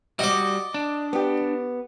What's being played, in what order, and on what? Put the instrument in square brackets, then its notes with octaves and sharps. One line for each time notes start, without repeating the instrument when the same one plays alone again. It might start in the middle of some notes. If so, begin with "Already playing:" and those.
[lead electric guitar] G3 F#4 [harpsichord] D5 D#5
[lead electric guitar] D4
[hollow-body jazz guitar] B3 G4